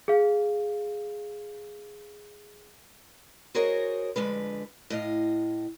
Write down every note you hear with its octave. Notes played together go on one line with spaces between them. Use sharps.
G#4 F5
F#4 G#4 A#4 C5 C#5 D#5
F2 D3 G#3 B4
A2 D#5 F5